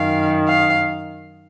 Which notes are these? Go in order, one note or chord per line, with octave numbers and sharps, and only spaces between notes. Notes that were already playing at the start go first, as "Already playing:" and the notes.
Already playing: F#2 D#3 F5
F5